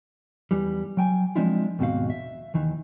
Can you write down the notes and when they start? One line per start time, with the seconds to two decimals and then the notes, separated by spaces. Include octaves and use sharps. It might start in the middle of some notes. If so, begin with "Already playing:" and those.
0.51 E2 E3 G3
0.97 F#3 G5 G#5
1.36 F3 G#3 C4 D4 E4 F4
1.79 D#2 G#2 B2 C4 F#4 F5
2.10 E5
2.54 D#2 D#3 E3